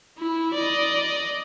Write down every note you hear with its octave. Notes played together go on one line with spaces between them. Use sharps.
E4
D5 D#5